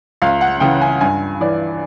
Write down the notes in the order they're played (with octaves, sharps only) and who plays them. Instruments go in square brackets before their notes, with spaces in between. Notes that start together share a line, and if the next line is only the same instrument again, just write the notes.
[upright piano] C#2 F5
F#5
C#3 E3 G5
G#5
G2 G#5
E3 D5